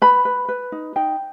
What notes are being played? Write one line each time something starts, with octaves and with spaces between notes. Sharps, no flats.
B4 B5
B4
B4
D#4
D#4 G5